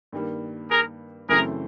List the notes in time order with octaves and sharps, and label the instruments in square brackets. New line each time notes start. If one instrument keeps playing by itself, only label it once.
[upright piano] G2 D#3 G3 A#3
[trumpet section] G#4 A#4
[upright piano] F#2 C#3 E3 A3 C4 [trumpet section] G#4 A#4